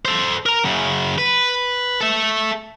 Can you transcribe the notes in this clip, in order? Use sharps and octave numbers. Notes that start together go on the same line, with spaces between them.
A4 C5
A#4 A#5
F#2 C#3
B4
A4 E5